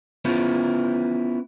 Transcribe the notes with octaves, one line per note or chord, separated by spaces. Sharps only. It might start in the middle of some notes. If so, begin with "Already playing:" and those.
B3 C#4 E4 F4 C5